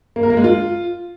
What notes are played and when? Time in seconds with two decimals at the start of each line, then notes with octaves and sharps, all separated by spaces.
0.16 A#3
0.23 A#4
0.30 A#3
0.37 G#3
0.44 F4